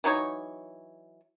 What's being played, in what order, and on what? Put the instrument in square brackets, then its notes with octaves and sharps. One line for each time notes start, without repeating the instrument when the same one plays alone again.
[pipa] E3 F#3 D#4 C#5